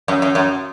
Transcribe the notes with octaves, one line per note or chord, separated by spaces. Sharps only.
F#2
F#2
F#2